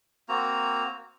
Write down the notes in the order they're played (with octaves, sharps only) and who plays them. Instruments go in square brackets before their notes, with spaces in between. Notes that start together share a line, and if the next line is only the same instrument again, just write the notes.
[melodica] A#3 C4 F#4 A#5